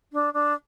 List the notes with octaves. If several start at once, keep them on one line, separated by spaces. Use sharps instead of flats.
D4
D4